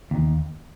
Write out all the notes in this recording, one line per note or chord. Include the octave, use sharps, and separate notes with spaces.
D#2